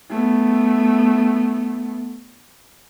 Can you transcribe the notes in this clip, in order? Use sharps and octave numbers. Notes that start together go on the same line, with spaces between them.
A3 B3